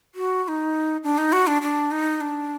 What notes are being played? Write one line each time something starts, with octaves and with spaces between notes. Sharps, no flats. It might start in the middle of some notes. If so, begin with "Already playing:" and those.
F#4
F#4
D#4
D4
D#4
F#4
D4
D4
D#4
D4